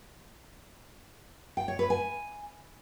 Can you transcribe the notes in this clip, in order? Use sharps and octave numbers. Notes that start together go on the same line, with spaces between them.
G5
C#5
B4
G#5